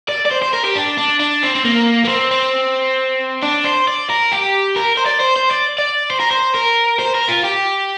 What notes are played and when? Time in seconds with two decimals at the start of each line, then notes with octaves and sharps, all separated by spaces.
0.09 D5
0.26 D5
0.31 C5
0.42 C5
0.54 A#4
0.64 G4
0.76 D4
0.98 D4
1.20 D4
1.43 C4
1.55 C4
1.65 A#3
2.05 A#3
2.09 C4
2.31 C4
3.43 D4
3.65 C5
3.88 D5
4.09 A#4
4.32 G4
4.76 A#4
4.97 C5
5.06 D5
5.20 C5
5.36 C5
5.51 D5
5.78 D5
6.10 C5
6.20 A#4
6.31 C5
6.54 A#4
6.99 C5
7.15 A#4
7.28 F4
7.44 G4